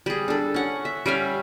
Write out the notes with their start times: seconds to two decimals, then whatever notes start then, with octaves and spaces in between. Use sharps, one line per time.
0.06 G3 G#4
0.28 D4 A4
0.54 C#4 F#5
0.85 E5
1.06 G3 C#4 E5 F5